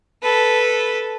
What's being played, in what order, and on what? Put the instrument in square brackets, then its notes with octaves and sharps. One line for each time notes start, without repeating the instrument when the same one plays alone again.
[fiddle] A4 B4